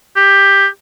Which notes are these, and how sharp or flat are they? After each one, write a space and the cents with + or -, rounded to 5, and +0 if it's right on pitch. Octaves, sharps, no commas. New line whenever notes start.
G4 +10